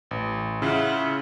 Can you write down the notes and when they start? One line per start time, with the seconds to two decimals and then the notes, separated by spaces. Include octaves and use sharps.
0.11 A1
0.62 C#3 E4 F4 F#5